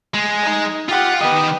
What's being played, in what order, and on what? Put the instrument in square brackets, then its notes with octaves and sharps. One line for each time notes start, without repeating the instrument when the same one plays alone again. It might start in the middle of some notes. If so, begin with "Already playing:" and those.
[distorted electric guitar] G#3
[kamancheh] D#4
[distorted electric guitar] F4 [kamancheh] G4 F#5
[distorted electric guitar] D#3 D#5 [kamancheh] B3 G4